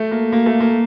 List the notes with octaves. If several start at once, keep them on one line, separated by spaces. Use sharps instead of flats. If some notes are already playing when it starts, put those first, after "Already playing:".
Already playing: A3
A#3
A#3
A3
A#3